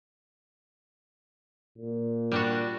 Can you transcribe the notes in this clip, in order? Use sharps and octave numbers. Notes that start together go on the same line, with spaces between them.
A#2
G3 D4 F#4